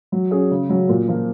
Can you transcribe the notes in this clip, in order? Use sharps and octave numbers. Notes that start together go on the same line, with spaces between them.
F#3
C#4 G#4
C#3
F#3 C#4
A#2
F3 A#3